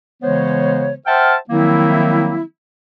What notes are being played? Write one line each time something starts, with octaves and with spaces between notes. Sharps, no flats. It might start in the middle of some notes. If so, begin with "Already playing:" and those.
C#3 E3 G#3 B3 C5 C#5
C5 E5 F#5 G5 A5 F6
D#3 F3 F#3 A#3 C4 E4